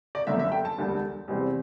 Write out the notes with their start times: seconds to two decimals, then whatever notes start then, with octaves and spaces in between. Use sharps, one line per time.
0.15 D5
0.27 G1 F#2 D3 A3 E5
0.39 E5
0.52 G5
0.65 A5
0.77 E1 D2 D3 G3
1.28 E2 C3 G3 C4